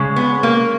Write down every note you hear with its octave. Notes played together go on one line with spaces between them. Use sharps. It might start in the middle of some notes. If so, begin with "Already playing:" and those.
Already playing: C#3 G#3
B3
A#3